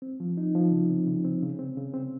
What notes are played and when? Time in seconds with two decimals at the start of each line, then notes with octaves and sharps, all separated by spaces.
0.02 C4
0.20 F3
0.37 D#4
0.55 F3
0.72 C#3
0.90 C4
1.07 C#3
1.24 C4
1.43 C#3
1.59 C4
1.77 C#3
1.94 C4